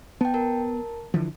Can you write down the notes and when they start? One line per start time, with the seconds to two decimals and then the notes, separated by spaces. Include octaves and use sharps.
0.21 B3 G5 A5
0.34 A#4 A5
1.14 D3 E3 F3